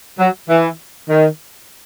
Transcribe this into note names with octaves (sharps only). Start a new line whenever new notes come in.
F#3
E3
D#3